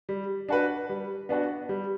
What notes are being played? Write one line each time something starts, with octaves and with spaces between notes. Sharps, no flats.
G3
D4 F#4 B4
G3
B3 D4 F#4
G3